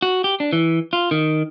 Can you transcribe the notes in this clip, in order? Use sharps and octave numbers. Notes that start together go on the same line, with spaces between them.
F#4
G4
D4
E3
F4
D#3